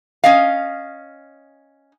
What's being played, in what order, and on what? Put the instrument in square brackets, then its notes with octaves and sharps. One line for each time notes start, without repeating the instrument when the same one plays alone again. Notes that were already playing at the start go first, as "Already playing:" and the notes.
[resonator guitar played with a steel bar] C#4 D#5 F5